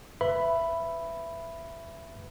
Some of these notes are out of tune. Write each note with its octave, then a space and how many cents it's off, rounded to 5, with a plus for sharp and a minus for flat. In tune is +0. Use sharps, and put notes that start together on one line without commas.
B4 +15 E5 +15 B5 +0